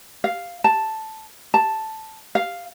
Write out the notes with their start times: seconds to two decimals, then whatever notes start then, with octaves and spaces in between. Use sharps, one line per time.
0.24 F5
0.64 A5
1.54 A5
2.35 F5